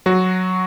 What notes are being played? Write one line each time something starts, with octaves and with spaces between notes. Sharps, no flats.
F#3 F#4